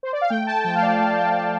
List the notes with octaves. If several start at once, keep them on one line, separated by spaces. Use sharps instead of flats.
C5
D5
F5
A3 G5
A5
F3 G5
F5
D5
A3 F5
G5
A3 A5